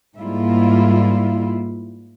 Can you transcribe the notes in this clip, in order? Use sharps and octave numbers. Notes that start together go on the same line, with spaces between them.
G#2 G3 A#3 E4 F4